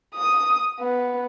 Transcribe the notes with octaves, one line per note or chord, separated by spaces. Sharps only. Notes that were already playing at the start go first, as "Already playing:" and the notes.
D#6
B3